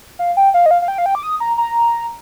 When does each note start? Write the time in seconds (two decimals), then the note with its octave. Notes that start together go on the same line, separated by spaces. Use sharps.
0.19 F5
0.37 G5
0.54 F5
0.66 D#5
0.71 F5
0.82 F5
0.88 G5
0.98 F5
1.06 G5
1.15 D6
1.23 D#6
1.40 A#5
1.58 A#5